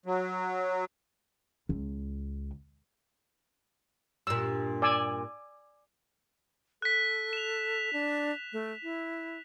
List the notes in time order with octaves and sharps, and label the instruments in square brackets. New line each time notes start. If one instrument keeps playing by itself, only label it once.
[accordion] F#3
[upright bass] C#2
[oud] G2 A#2 [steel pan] E6
[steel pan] D5 G#5 E6
[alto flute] A4 [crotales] F#6 B6
[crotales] E7 F7
[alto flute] D4
A3
E4